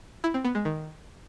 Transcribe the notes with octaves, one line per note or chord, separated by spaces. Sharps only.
E4
C4
B3
G#3
D#3